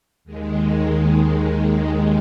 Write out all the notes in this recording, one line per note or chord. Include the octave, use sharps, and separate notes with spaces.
D#2 D#3 G#3